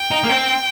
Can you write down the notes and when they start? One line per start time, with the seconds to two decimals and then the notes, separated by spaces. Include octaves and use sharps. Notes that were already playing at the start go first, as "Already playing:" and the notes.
Already playing: G5
0.11 D#4
0.24 A#3
0.30 C4